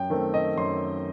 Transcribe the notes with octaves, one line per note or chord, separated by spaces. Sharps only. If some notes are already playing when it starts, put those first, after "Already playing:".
Already playing: F#2 G5
D#3 A3 C4
D#5
F#2 C6